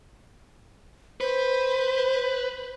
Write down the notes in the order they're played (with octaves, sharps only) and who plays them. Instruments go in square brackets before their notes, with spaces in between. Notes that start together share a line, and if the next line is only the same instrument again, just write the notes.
[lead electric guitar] B4 [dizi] C5